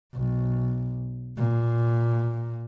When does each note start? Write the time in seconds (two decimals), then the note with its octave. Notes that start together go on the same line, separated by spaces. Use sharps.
0.15 B1
1.37 A#2